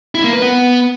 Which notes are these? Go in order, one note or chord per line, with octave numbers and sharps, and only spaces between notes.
E4
A#3
B4
B3